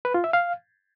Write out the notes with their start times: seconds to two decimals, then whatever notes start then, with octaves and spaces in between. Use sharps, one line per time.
0.05 B4
0.14 F4
0.24 E5
0.33 F5